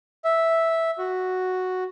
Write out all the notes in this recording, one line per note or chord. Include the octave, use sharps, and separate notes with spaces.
E5
F#4